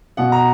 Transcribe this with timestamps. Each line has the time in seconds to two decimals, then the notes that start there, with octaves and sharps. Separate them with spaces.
0.17 B2 F#5
0.32 A#5